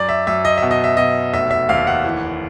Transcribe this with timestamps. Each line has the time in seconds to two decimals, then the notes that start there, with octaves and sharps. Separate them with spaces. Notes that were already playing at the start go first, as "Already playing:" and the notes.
Already playing: F#2 D5
0.09 E5
0.27 F#2 E5
0.45 D#5
0.57 B2 E5
0.71 D#5
0.84 E5
0.97 B2 D#5
1.33 F1 E5
1.51 E5
1.69 D#2 F5
1.87 F#5
2.04 E3